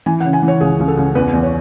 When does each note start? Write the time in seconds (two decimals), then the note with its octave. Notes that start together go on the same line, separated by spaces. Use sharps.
0.06 E3 G#5
0.20 F#5
0.25 C#3
0.33 G#5
0.43 E3
0.48 C#5
0.61 C#2 G#4
0.79 C#2
0.88 A4
0.97 C#2
1.15 E2 B4
1.33 E2
1.43 C#5